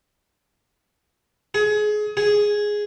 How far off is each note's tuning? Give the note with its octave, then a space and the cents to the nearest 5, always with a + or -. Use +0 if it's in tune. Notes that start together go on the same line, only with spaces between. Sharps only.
G#4 +25
G#4 +0